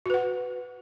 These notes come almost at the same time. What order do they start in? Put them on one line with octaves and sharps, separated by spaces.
F#4 B4 F#5